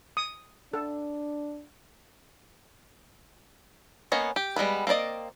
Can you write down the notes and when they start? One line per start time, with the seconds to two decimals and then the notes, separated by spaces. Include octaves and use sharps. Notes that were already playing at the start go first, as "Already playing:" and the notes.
0.17 D#6
0.73 D4 A4
4.12 A#3 B3 C#4 C#5 D#5
4.36 G4
4.56 G3 G#3 B3 B4
4.87 A#3 C4 B4 D5 D#5